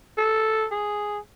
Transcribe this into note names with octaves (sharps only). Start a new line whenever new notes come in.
A4
G#4